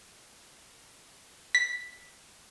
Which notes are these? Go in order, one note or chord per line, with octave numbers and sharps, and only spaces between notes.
B6